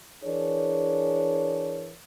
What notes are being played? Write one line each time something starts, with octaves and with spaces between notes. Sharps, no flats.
E3 D4 G#4 A#4 C#5